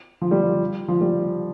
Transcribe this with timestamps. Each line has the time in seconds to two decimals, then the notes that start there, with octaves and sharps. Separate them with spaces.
0.21 F3
0.31 G3
0.42 F3
0.88 F3
1.01 G3